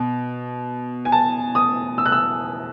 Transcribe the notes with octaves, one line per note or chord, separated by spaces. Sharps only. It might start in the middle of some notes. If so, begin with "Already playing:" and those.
Already playing: B2
G#5
A5
D#6
E6
F#6
E6